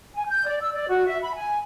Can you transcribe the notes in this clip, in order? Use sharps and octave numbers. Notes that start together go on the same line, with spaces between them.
G#5
G6
D5
E6
D5
F#4
E5
B5
G#5